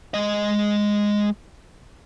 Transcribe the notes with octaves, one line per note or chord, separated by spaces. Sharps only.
G#3 D#5